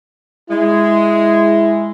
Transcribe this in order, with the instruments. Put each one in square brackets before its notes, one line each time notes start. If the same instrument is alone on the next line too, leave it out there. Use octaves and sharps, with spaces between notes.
[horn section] G#3 [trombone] E4